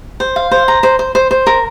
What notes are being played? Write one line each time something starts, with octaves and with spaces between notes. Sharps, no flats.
C5
F5
C5
A#5
C5
C5
C5
C5
A#4